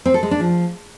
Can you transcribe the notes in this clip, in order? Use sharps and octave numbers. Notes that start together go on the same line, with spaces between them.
C4
A4
G#3
D4
F3